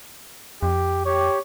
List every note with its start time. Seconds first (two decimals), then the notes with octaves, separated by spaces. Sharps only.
0.63 F2 G4
1.05 G4 C#5